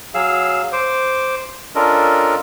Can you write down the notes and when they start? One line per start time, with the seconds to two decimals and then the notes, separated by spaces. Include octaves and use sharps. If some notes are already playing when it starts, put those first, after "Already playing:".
0.14 F#3 G#4 F5 E6
0.73 C5 D6
1.75 C#4 D4 F4 A4 A#4 D#5